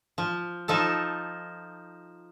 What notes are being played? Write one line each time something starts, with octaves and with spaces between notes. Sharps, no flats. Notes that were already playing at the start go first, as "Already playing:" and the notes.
F3
F3 D#4 A4